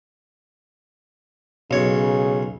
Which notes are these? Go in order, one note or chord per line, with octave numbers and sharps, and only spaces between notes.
B1 C#3 C#5